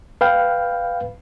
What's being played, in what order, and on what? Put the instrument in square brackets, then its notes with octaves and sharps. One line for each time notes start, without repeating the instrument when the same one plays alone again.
[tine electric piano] B4 F5 G5